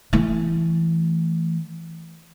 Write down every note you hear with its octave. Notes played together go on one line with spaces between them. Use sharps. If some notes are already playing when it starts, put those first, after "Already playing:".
E3 A3